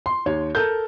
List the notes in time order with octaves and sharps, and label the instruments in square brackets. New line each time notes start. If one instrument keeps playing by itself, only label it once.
[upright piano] C6
[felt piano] D#2 C#5
[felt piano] A4 A#4 [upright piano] G6